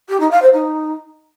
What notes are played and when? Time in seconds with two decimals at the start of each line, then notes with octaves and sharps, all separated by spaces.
0.09 G4
0.20 D#4
0.31 F5
0.42 C5
0.53 D#4